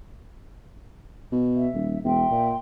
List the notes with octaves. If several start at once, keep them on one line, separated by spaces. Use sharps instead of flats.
B2
E5
D#1
E1 E5 G5 C6
A#2